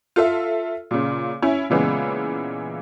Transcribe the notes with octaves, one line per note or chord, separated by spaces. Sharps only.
F4 A4 E5
A#2 C#3
C#4 E4
A#2 C#3 E3 G#3 B3